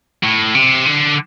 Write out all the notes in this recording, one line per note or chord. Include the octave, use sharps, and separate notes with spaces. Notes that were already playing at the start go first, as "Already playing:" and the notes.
A2
C3
D3